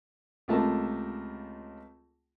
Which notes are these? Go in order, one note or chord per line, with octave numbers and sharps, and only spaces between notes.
C#2 C3 A3 F4 A#4 A5